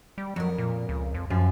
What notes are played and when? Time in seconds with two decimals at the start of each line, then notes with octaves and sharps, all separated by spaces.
0.18 G3
0.36 F2 F#3 A#4
0.58 A#2
0.89 C#2
1.14 F2
1.30 F#2 F3